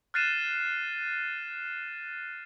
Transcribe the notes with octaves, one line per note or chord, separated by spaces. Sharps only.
F6 F#6 A6 C7 D#7 E7